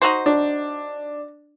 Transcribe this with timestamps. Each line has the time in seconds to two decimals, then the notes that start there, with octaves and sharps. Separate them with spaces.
0.02 D#4 F#4 C5
0.26 D4